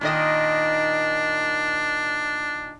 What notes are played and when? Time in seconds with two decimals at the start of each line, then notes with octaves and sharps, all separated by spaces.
0.01 A#2 D#3 D4 D#5